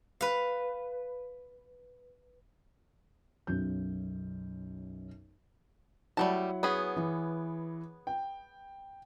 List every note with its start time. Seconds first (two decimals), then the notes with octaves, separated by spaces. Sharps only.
0.21 B4 F5
3.47 B1 F#2 G6
6.17 F#3 G3 A3 E4 F#5 A5
6.63 B3 C#4 G#4
6.97 E3
8.07 G5